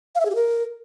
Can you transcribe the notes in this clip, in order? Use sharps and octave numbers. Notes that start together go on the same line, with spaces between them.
F5
E5
G#4
G4
A#4